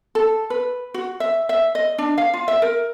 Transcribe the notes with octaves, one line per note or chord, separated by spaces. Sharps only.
A4
B4
F#4
E5
E5
D#5
D4
F5
F4
E5
A#4